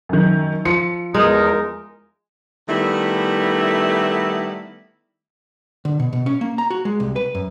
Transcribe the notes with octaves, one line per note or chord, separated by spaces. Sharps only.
F#2 D#3
F3 C#7
E2 G#3 D#4 A#4
D#3 G3 A3 B3 E4
D3
B2
B2
C#4
A#3
A#5
F#4
G#3
C2
B4
F#2